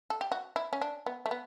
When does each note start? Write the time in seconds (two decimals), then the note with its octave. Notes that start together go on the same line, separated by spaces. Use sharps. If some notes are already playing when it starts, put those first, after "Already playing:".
0.10 A4
0.21 G4
0.32 F#4
0.56 E4
0.73 C#4
0.81 D4
1.06 B3
1.26 A3
1.31 B3